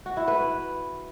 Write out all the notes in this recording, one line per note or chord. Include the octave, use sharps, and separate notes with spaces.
F#4
E4
B4